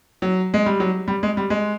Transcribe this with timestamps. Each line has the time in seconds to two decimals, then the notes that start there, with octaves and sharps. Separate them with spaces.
0.22 F#3
0.54 G#3
0.66 G3
0.80 F#3
1.08 G3
1.23 G#3
1.37 G3
1.50 G#3